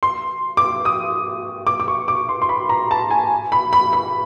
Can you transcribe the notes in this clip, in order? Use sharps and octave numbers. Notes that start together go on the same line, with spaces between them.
C6
D6
D#6
D6
D6
C#6
D6
C6
C6
B5
A#5
A5
G#5
B5
B5
B5